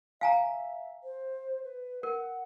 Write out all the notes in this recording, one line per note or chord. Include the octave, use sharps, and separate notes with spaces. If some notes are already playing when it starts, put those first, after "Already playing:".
E5 F5 G#5 A#5
C5
B4
A#4 F#5